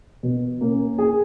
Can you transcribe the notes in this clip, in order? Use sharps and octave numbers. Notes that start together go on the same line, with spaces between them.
B2
A#3 C#4
G#4